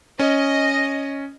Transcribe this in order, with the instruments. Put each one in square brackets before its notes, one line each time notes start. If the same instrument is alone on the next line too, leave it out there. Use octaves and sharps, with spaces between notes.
[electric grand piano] C#4 [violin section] D#5